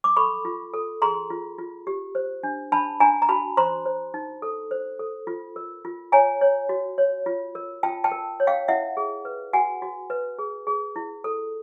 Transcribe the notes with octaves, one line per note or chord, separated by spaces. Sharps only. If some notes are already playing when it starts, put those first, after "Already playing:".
D6
A4 B5 C#6
F4
A4
G#4 A#5 C6
F4
F4
G4
C5
D4
D4 A5 B5
D4 G#5 A#5
A#5
F#4 A5 B5
C5 A#5 C6
C5
D#4
A4
C5
A4
F4
A#4
F4
C#5 G#5 A#5
C#5
F#4
C#5
F4
A#4
F4 G5 A5
G5 A5
A#4
C#5
F5 G5
E4 E5 F#5
G#4
B4
F#4 F#5 G#5
F#4
B4
G#4
G#4
E4
A4